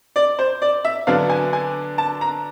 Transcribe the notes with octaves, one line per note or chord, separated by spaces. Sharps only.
D5
C5
D5
E5
D3 F#3 B3 D4 F5
G#5
G#5
A5
A#5